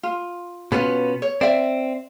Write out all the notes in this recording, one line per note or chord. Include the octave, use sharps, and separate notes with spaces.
F4
B2 B3 C#4 F4 B4
C#5
C4 D5 E5